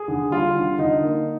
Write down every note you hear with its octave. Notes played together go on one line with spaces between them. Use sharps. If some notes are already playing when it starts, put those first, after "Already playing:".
Already playing: G#4
D3
G3 F4
D3
D3 D#4
A#3